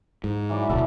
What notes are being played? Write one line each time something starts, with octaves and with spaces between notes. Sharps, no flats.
G#2
E3 F#3 D5
D1 B1 E3 B3 A4